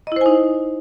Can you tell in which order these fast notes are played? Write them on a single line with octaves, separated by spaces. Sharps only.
D#5 E4 C5 G#5 D#4